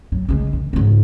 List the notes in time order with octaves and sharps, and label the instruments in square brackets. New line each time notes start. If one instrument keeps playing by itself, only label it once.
[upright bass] F#3
C#3 G#3
A#1
G#2 C#3